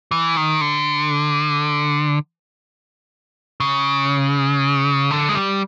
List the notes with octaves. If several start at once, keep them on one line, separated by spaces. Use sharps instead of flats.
E3
D#3
D3
C#3
D3
G#3
G3